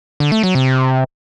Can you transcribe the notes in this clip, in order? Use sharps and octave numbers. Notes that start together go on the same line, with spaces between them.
D3
A3
F#3
C3